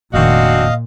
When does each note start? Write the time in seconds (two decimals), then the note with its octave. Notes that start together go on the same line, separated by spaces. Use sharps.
0.14 F1 A#2 D#3 C4 D4 F#4 D#5 F5